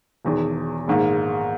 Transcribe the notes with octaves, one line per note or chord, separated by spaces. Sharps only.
E1 E2 D#3
A#1 G#2 D#3 A#3